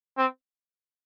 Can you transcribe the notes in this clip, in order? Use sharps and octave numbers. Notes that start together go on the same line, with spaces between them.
C4